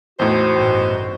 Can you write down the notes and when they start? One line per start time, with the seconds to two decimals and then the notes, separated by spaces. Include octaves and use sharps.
0.19 E2 A2 D#4 F#4 C5
0.55 A1 G2 B2